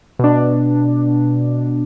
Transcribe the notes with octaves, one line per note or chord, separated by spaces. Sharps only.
B2 D4